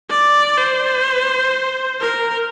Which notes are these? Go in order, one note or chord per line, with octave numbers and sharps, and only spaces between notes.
D5
C5
A#4